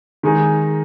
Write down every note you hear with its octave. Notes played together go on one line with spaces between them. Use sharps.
D#3 G#3 D#4 G#4